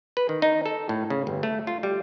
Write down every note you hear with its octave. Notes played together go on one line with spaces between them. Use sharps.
B4
D#3
D#4
A4
A2
C#3
G1
A3
F4
G3